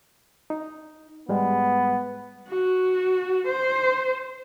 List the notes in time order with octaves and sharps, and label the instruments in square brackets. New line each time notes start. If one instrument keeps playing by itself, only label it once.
[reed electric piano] D#4
[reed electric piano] G#2 G3 G#3 [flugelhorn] B3
[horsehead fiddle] F#4
C5